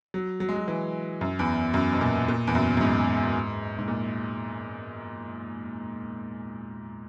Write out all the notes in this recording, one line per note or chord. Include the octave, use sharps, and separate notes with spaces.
F#3
F#3
G#3
F#3
E3
F#2
E2
F#2
B2
A#2
A#2
E2
F#2
F#2
G#2
G#2
A#2